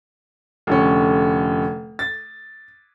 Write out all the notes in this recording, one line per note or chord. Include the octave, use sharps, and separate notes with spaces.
F1 D3 C#4
A6